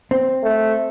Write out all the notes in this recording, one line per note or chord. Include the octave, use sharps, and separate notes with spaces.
C4
A3